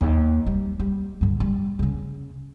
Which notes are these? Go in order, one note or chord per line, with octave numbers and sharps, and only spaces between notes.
D#2
G3
G3
G2 D3
G3
C#3 C#4